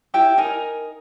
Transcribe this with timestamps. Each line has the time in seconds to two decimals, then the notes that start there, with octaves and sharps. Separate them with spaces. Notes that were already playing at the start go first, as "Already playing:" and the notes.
0.14 E4 G4 G5
0.38 D#4 A#4 G#5